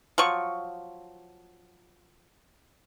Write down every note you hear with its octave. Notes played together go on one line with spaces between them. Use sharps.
F3 F#3 C#6